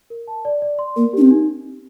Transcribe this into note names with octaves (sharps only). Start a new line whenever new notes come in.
A#4
A5
D5
D5
C6
A#3 A#4
D4 G4
C4
D#4